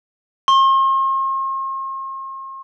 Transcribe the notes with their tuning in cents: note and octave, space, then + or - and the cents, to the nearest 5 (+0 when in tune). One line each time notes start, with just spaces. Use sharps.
C6 +45